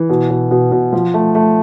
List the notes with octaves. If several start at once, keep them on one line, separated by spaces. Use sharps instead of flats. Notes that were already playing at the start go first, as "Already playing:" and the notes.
Already playing: E3
B2
B2
B2
B2
F3
A3
A3